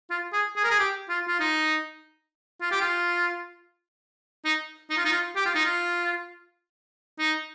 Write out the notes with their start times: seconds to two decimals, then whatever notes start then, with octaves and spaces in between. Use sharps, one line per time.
0.10 F4
0.33 G#4
0.56 G#4
0.64 A#4
0.71 G#4
0.79 G4
1.09 F4
1.28 F4
1.40 D#4
2.61 F4
2.71 G4
2.81 F4
4.45 D#4
4.90 D#4
4.97 F4
5.05 D#4
5.12 F4
5.36 G4
5.46 F4
5.55 D#4
5.65 F4
7.19 D#4